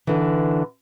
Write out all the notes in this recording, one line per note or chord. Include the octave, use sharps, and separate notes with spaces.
D3 E3